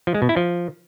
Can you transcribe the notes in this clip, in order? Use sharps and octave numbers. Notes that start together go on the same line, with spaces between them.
F3
G#3
B2
E4
F3